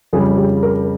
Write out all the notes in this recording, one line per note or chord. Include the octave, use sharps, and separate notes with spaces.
F2 C#3 G3 G#4
G4
A#4